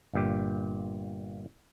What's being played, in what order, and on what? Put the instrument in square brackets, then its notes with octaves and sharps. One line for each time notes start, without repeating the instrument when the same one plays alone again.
[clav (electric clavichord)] G1 G2 A#2 G4